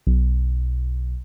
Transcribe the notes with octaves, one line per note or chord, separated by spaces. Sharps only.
B1